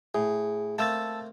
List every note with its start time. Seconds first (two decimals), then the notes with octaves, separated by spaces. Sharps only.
0.15 A2 G#4
0.78 A3 A#3 C4 A5 E6 A6